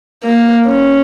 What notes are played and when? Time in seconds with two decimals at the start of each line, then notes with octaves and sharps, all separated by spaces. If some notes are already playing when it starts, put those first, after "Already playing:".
0.24 A#3
0.67 C#4